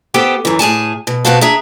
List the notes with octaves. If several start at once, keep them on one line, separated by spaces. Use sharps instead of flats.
B3 G4 A4 C5 G5
F#2 E3
A2 G#4 G#5 A5
B2
B2 B3 C4 F#4 F5 A5
D4 G#4 E5 A#5